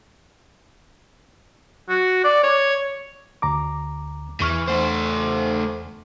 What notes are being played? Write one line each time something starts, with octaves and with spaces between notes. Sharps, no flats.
F#4
D5
C#5
D2 A#5 D6
E2 E3 C#6 F6
A3 C5